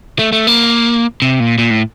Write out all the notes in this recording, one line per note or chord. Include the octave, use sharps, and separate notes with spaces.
A3
A3
A#3
C3
A#2
A#2
A2